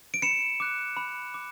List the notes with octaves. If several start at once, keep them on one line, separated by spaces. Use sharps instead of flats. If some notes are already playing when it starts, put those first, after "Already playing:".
D7
B5 C#7 E7
D6 F#6
B5
D6